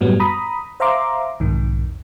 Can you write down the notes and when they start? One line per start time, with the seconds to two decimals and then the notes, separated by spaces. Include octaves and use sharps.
0.01 F#2 A2 F#3 G3 B3
0.20 A#5 B5 D#6
0.80 C5 E5 F5 A#5 C6 D6
1.40 B1 F2 G#2 D#3